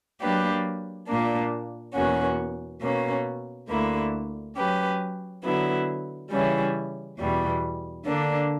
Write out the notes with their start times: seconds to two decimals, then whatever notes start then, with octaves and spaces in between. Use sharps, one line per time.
0.19 F#3 A#3 D4 G4 B4
1.06 A#2 A#3 D4
1.93 E2 B2 A#3 C#4 F#4
2.80 B2 A#3 C#4
3.68 D2 D3 A#3 E4
4.55 F#3 C#4 G4 B4
5.43 D3 F#3 B3 E4
6.30 C#3 E3 G3 C#4 E4
7.17 E2 B2 G3
8.05 D3 A#3 D4